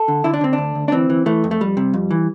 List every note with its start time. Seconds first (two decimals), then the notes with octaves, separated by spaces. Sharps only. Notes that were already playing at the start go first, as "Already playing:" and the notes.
Already playing: A4
0.08 D3
0.24 D3 E4
0.34 D4
0.41 D3 C4
0.53 D4
0.58 D2
0.75 D2
0.88 D4
0.92 E3 C4
1.10 E3
1.26 E3 A3
1.44 F2
1.51 A3
1.61 F2 G3
1.77 C3
1.94 F2
2.11 E3